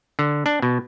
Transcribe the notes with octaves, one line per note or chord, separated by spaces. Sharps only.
D3
D4
B2